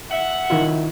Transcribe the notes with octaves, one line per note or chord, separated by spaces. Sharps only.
E5 F#5
D#3 E4 F4